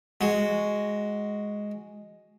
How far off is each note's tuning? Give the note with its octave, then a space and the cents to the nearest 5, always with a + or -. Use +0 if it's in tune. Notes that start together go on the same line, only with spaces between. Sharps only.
G#3 +0 F#4 +0